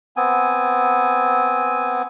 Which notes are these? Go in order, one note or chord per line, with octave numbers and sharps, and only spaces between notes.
B3 C4 G#5